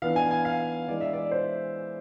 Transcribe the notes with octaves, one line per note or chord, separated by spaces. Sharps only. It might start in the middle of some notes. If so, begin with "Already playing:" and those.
E3 B3 D4 F5
G#5
G#5
F5
E3 G#3 D4 D5
E5
D5
C5